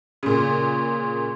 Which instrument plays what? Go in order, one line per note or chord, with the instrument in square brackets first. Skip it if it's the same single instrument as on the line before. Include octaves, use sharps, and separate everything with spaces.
[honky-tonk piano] A#2 C#3